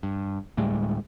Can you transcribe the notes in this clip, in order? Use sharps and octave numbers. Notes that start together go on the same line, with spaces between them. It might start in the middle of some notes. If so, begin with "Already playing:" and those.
G2
D2 A2 G3 G#3